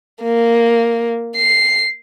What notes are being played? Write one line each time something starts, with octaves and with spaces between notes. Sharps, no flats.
A#3
C7